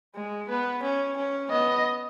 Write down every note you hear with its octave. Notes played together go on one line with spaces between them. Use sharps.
G#3
B3 B4
C#4
C#4
B3 D#5